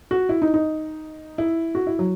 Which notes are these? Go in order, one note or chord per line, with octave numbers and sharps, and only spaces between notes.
F#4
E4
D#4
D#4
E4
F#4
E4
F#3